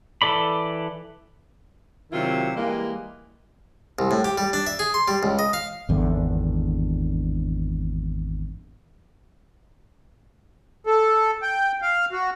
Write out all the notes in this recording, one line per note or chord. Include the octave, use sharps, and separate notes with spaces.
E3 A4 D5 B5
C3 D#3 F#3 E4 F4
E3 G3 G#3 A#3
C2
A2
G4
G3
D4
E5
G#4
C6
G3
C#2
D#5
F5
G#1 E2 G2 D3
A4
G5
F5
F#4